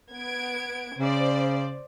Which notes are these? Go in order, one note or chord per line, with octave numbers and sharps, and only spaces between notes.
B3 G#6 D7
C#3 C5 D5